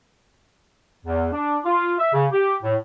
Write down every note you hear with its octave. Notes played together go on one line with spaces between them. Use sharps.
E2
D4
F4
E5
C#3
G4
A2